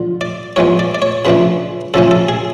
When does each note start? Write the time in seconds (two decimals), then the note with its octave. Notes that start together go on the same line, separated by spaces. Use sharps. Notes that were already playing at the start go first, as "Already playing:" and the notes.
Already playing: D3 F3
0.21 D5
0.56 A2 F3 G#3 B3 C#5
0.79 D5
0.95 D5
1.02 C#5
1.25 C#3 F3 A3 D4 B4
1.94 C#3 F3 A3 C#4 A4
2.11 A4
2.29 G#4